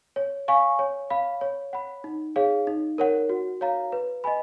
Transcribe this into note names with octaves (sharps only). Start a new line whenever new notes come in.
C#5
F5 G#5 C#6
C#5
F5 B5
C#5
F#5 B5
D#4
G#4 C#5 F5
D#4
A#4 C#5 F#5
F#4
C#5 F5 A#5
B4
D#5 G#5 B5